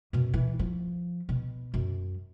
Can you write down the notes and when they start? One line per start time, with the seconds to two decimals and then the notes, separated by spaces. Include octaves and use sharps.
0.13 F#2 B2
0.34 E3
0.59 F3
1.29 B2
1.74 F#2